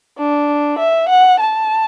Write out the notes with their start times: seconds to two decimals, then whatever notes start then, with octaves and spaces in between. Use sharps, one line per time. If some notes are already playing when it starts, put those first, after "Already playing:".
0.18 D4
0.79 E5
1.09 F#5
1.40 A5